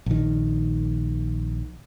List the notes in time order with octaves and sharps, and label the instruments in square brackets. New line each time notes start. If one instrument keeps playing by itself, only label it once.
[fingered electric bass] A#1 D#3